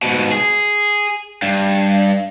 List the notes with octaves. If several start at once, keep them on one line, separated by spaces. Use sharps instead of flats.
G#2 B2
G#4
G2